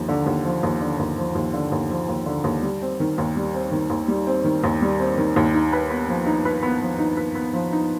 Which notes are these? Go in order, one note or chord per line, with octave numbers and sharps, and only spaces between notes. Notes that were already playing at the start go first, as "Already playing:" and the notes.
Already playing: D#2 F3
D3
D#2
F3
D#2
D3
D#2
F3
D#2
D3
D#2
F3
D#2
D3
D#2
G3
C4
D#3
D#2
G3
C4
D#3
D#2
G3
C4
D#3
D#2
G3
C4
D#3
D#2
D#4
B4
B3
F3
D#4
B4
B3
F3
D#4
B4
B3
F3
D#4